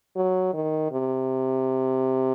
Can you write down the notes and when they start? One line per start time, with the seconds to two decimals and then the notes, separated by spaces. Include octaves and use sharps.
0.16 F#3
0.54 D#3
0.91 C3